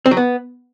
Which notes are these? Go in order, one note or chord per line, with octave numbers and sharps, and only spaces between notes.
C4
F#3
B3